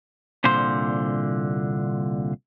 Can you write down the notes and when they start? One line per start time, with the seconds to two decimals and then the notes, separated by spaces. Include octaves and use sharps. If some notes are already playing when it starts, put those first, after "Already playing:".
0.44 C2 A#2 D3 C5 C6